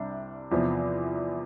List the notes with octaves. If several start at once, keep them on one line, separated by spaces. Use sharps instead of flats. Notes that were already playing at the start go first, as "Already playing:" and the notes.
Already playing: C2 C3 G3 D4
E2 C3 F3 B3